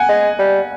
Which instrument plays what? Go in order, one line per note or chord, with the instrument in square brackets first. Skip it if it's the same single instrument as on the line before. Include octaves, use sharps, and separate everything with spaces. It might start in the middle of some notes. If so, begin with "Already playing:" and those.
Already playing: [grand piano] F#5 G#5
[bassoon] G#3
G3